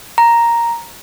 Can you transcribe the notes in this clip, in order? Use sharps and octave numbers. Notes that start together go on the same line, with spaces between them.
A#5